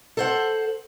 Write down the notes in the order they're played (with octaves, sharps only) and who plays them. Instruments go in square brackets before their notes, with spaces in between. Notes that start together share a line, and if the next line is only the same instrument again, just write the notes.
[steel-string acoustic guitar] A4 C5 F#5